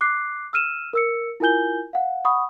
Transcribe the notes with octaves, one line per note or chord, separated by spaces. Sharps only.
D6 F#6 C7
E6 F6 D#7 E7
A#4 E6 C#7
E4 F4 A#4 G#5 G6 G7
F5 F#5
F#5 B5 C#6 D#6